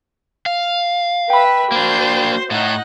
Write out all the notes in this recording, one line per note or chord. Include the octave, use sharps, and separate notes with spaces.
F5
B4 E5 G5 B5
A#3 D4 F#4 C5
A2 D#4 F#5